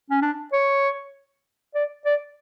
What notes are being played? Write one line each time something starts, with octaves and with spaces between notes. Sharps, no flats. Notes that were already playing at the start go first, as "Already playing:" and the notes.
C#4
D4
C#5
D5
D5